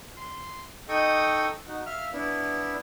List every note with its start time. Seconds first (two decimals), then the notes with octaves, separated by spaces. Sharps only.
0.17 C6
0.89 D#4 A4 D#5 G5 C#6 D#6
1.67 D#4 F#4
1.86 E5 F5 F6
2.13 B3 D4 E4